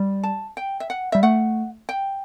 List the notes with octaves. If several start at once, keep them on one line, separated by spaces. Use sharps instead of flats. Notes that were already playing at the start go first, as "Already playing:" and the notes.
Already playing: G3
A5
G5
E5
F#5
G3 E5
A3 F#5
G5